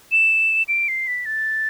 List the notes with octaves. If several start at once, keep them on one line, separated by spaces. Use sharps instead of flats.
E7
D7
C7
B6
A6